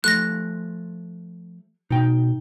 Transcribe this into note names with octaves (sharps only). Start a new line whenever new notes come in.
F3 A3 F#6 A#6
B2 D#4 G5